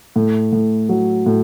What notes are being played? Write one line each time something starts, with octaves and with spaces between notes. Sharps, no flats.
A2
A2
F#3
A2